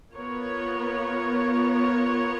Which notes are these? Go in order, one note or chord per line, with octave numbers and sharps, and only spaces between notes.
B3 F4 A#4 C#5